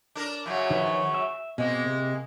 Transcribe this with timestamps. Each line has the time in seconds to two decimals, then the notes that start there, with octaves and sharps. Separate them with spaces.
0.15 D4 A#4
0.46 F#2 C#3 F#3
0.70 D#3 F3 B4
1.14 E5
1.58 B2 G#3 A#3 C4
1.86 C3